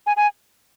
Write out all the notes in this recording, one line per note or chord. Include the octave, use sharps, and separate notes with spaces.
G#5
G#5